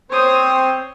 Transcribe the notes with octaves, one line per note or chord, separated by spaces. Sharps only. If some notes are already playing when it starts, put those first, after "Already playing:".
C4 C5 C#5 D#6